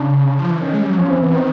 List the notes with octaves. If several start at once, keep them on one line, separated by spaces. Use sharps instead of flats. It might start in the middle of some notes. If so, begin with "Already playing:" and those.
Already playing: C#3 D4
F3
E3
D#3 C#4
G#3
G3
F#3
F3 C#4
E3 C4
E3 B3
D#3 C4